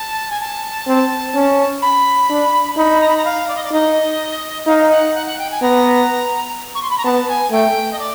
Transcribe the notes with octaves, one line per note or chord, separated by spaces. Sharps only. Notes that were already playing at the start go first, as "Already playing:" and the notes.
Already playing: A5
G#5
A5
C4
C#4
B5
D4
D#4 B5
A#5
B5
A#5
F5
D5
D#5
D5
D#4 D#5
D#4 F5
F#5
F#5
F#5
G5
G#5
B3 A#5
C#6
C6
B5
A#5
B3 A5
G#5
A3 G5
D#5
D5